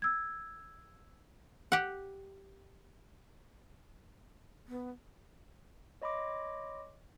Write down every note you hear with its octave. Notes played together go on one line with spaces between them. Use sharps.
E6 G#6
G4 F#5
B3
C#5 D#5 B5 C6 D6 A#6